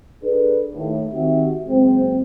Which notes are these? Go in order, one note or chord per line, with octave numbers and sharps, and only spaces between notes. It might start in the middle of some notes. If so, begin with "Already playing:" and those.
D4 G#4 A4 B4 D5
D#2 A2
D#3 C4 F#4 G4 E5
F#1 G#3 C4